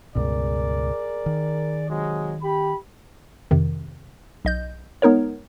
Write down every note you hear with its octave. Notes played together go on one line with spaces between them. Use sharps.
C#2 G2 B2 G#4 A#4 D5
D#3
C3 F#3 G#3
G4 B5
F2 C3 D#3
B1 D#5 G6
G#3 B3 D#4 A#4 C#5